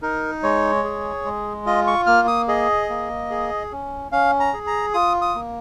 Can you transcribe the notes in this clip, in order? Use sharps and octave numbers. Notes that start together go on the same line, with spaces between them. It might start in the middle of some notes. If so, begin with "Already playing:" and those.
D#4 A#4
G#3 C#5
G#4
G#3
F4 D#5
C#6
A#3 F6
D#6
G#4 D#5
A#3
G#4
C#4
C#4 F5
A#5
G#4
A#5
F4 D#6
D#6
A#3